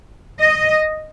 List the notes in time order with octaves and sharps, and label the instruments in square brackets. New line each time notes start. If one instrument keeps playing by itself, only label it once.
[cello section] D#5